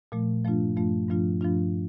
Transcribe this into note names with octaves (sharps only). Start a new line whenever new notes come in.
A#2 F3 A3
G2 F3 A3 D4 F4
G2 F3 A3 D4 F4
G2 F3 A3 D4 F4
G2 F3 A3 D4 F4